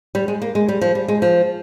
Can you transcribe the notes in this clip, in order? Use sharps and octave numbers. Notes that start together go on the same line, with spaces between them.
G3
G#3
A#3
G#3
G3
F3
G3
G#3
F3